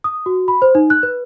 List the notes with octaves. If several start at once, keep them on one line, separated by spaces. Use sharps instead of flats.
D#6
F#4
B5
C5
D#4
F#6
B4